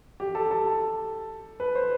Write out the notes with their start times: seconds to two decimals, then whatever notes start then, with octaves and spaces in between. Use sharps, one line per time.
0.20 G4
0.35 A4
0.51 A4
1.60 B4
1.75 C5